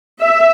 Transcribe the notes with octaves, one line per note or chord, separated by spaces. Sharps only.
E5